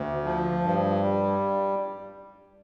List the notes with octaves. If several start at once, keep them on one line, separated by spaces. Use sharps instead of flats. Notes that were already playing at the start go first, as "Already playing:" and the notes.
Already playing: D2
F3
G2
G3